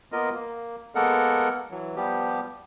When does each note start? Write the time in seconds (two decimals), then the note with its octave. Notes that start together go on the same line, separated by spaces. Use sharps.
0.12 A#3 B3 F4 A#4 D#5
0.34 A#3
0.95 G#3 A#3 B3 A4 A#4 F#5
1.71 E3 F#3
1.96 F3 G3 B3 G4